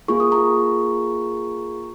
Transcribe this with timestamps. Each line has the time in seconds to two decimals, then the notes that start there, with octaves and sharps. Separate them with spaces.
0.08 A#3 F4 G#4 C#6
0.20 D#6
0.32 A#5 C#6